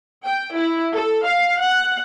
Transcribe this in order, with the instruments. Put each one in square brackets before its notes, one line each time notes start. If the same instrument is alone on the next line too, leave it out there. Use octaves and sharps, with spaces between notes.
[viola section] G5
E4
A4
F5
F#5